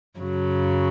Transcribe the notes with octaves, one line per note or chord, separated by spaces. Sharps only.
F#2 C#3 F#3